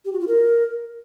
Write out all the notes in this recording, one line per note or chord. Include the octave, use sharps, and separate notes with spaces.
G4
F#4
F4
A#4